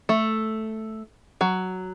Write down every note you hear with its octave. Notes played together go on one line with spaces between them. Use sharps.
A3
F#3